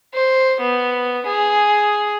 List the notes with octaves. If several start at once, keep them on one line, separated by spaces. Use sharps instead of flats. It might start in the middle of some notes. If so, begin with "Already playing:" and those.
C5
B3
G#4